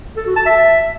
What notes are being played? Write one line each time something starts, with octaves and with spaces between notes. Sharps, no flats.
A4
F#4
A5
E5